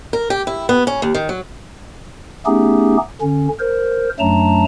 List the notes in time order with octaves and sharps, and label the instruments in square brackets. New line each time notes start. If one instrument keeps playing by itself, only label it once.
[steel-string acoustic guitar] A#4
G4
E4
B3
C#4
D#2
D#3
F#3
[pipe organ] A3 B3 C#4 D#4 G4 G#4
D3 C#4
A#4 C5
F#2 F#3 A3 D4 A5 A#5